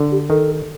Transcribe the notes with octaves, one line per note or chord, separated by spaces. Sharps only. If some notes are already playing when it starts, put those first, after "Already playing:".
Already playing: D3
G4
D#3 A4